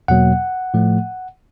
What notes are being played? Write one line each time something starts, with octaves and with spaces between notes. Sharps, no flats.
E2 B2 F#3 A#3 F#5
A2 F3 A3